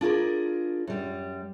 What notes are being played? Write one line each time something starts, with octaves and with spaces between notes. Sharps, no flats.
D4 F4 G#4 A#4
F#2 G3